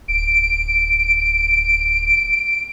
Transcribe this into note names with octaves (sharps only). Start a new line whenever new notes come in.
D1 D7